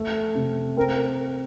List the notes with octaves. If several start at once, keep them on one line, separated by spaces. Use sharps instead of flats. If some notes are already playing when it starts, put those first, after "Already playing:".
Already playing: A3
C3
C4 A#4